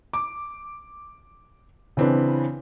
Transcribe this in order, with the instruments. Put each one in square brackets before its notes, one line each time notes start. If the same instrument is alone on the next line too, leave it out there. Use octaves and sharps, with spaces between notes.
[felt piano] D6
C#3 E3 C4 D4 B4